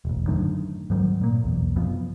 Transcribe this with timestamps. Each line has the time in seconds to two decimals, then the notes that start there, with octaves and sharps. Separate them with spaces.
0.05 E1 A1
0.27 F#2 A2 D3 D#3
0.90 G#2 D#3 F#3 G3
1.21 A#2 A#3
1.44 B1 E2
1.76 F#2 C3 F3 B3